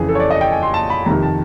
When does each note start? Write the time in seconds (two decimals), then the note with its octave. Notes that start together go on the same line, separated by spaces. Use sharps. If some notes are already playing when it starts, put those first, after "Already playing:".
Already playing: F2 C#3 E3 G#4
0.09 A4
0.15 C#5
0.20 D5
0.30 D#5
0.41 G5
0.52 G#5
0.63 C6
0.74 A5
0.90 B5
1.06 F2 C3 D#3 A#5
1.22 A5